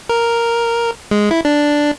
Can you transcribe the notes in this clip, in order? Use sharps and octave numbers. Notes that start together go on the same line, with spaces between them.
A#4
G#3
E4
D4